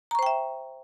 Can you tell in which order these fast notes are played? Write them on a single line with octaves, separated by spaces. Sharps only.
A#5 C#6 C5 G5 E5